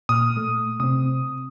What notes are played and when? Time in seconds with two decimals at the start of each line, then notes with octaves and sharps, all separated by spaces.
0.09 A#2 D#6 F6
0.37 A3
0.80 C3 C4 D#6